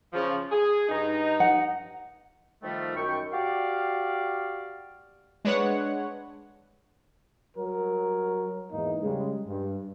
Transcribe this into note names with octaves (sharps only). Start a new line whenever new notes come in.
C#3 F3
G#4
G2 D#4
F#5
D#3 F3 G3 A3
F#2 D#3 G5 C#6
F#4 G4 D5 F5
G#3 D4 B4 C#5 F#5
F#3 G3 A#4
E2 G#2 A#3 D#4
C#3 G3 G#3
G2